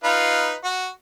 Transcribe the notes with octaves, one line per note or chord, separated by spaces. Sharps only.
D#4 F4 B4
F#4